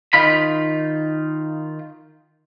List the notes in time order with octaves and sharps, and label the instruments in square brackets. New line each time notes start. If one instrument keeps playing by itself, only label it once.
[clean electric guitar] D#3 D#4 F4 B5